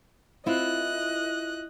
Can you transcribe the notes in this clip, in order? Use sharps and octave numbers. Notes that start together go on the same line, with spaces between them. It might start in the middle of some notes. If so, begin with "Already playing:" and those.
C4 E4 F4 D#5 F#6